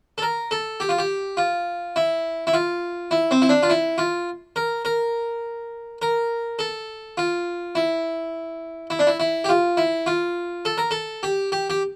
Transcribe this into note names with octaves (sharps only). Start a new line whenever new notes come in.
A4
A#4
A4
G4
F4
G4
F4
E4
E4
F4
E4
C4
E4
D4
F4
E4
F4
A#4
A#4
A#4
A4
F4
E4
E4
D4
E4
E4
G4
F4
E4
F4
A4
A#4
A4
G4
G4
G4